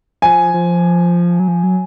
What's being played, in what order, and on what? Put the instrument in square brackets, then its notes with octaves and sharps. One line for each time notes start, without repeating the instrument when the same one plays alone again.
[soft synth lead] F3 [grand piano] G#5
[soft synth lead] F3
F#3
F3
F#3